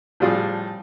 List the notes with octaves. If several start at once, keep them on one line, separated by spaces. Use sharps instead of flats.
A2 F3 G3 F4 G#4